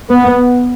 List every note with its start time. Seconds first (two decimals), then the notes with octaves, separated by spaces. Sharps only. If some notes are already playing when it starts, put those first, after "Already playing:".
0.10 B3